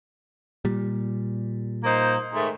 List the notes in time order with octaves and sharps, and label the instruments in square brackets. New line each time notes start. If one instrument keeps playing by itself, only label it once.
[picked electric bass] A#2 G3
[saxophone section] A#3 D#4 C5
G#2 D#3 A3